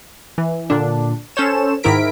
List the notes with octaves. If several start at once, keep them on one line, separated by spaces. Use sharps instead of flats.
E3
A#2 D3 D4
C#4 A4 C5 C#5 E7
G#2 D#3 E4 A#4 B6 D7